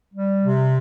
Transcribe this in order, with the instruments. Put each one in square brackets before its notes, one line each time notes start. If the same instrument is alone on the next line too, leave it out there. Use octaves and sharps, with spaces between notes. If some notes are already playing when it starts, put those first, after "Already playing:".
[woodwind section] G3
C3